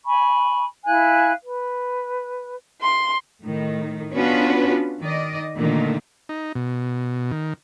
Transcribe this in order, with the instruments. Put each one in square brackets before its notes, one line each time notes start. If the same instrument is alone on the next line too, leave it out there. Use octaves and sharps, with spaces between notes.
[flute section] G#5 B5 C#6
E4 F5 G#5 F#6
B4
[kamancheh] C6
[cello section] A2 D#3
B3 C#4 D4 F4 F#4 B4
D#3 D5 D#5
A#2 D3 D#3 A3 A#3
[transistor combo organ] D#4
B2
D#3